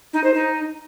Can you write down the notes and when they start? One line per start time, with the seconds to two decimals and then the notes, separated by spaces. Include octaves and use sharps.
0.13 D#4
0.24 C5
0.34 D#4